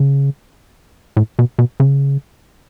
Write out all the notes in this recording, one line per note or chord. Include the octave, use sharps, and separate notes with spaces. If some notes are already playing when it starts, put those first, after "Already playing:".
Already playing: C#3
A2
B2
B2
C#3